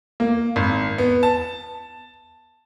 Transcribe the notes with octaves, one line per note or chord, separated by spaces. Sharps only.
A#3
G#1
B3
A5